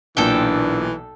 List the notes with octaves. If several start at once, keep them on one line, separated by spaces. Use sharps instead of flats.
B1 A#2 E3 D4 A4 G5